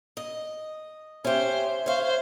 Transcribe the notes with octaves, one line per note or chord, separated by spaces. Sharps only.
D#5
C#4 G4 C5 E5
C5 C#5 F5
C5